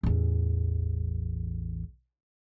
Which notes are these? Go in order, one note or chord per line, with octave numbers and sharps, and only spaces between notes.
A1 E2